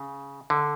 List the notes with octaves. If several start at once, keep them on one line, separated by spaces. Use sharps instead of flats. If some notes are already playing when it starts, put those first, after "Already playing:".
Already playing: C#3
D3